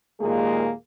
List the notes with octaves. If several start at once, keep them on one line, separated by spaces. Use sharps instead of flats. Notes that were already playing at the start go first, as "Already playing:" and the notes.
D#2 A#2 G#3 A#3 G#4